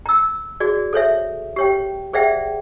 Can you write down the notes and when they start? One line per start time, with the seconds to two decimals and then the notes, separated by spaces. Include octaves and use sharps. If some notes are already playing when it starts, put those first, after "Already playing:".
0.06 A#5 E6
0.60 F#4 G#4 D5
0.93 A4 C5 C#5 E5
1.56 G4 C#5 G5
2.13 G#4 C5 D5 E5 F#5 G5